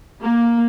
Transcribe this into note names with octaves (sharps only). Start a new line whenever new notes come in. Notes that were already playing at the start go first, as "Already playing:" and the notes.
A#3